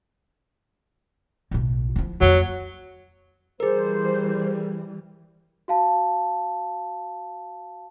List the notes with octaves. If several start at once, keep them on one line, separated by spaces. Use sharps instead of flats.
B1 A2
F3 E4
F2 F#3 A#3
E3 G3 G#4 A#4 C5
F#4 F5 A5